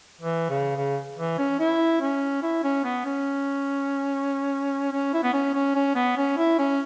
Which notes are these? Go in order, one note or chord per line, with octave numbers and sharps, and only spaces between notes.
E3
C#3
C#3
E3
C#4
E4
C#4
E4
C#4
B3
C#4
C#4
E4
B3
C#4
C#4
C#4
B3
C#4
E4
C#4